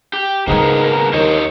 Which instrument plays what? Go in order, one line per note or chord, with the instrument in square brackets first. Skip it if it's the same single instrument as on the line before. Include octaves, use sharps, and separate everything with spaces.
[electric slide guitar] G4
[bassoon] G#2 [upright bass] C#3 G3 [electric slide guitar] A#3 B3 G#4 [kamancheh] A#4
[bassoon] D#2 [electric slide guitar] C5 C#5 D#5